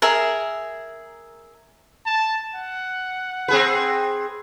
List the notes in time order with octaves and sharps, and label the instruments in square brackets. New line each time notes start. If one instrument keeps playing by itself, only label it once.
[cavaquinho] G#4 A#4 E5
[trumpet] A5
F#5
[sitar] C4 G#4 B4